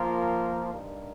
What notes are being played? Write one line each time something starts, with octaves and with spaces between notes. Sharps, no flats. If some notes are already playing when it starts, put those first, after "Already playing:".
Already playing: F3 A#3 F4 A#4
G2 G3 D#4 A#4